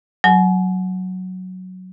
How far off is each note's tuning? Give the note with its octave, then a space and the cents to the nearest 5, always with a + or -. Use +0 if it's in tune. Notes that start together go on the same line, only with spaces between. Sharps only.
F#3 +0 G#5 +40